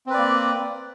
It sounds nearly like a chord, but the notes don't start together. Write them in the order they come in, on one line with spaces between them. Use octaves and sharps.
C4 B4 D5 A#3